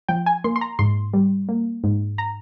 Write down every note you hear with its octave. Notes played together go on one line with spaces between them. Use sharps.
F3 G5
G#5
A#3 C6
C6
A#5
G#2 C6
G3
A#3
G#2
A#5